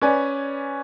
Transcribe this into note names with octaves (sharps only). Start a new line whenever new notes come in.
C#4 B4 D5 G#5